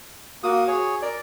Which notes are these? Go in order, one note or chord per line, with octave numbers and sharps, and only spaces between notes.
A#3 F#4 D#6
G#4 C#5
A#4 D5